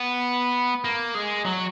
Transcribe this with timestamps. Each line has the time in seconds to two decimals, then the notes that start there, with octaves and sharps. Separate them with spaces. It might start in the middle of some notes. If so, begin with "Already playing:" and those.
Already playing: B3
0.84 A#3
1.15 G#3
1.45 F#3